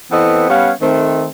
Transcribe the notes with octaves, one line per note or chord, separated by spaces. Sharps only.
E3 B3 C4 A4 C5 D#5
G3 B3 C#4 C#5 F5
D#3 A3 C4